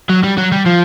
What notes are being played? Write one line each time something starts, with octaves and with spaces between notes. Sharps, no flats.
F#3
G3
F#3
G3
F3